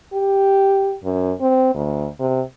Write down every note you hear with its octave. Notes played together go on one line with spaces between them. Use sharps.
G4
F#2
C4
D2
C3